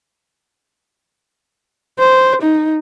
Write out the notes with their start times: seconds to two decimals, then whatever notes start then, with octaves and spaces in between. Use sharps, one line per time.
1.99 C5
2.42 D#4